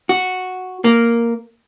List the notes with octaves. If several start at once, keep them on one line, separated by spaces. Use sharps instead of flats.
F#4
A#3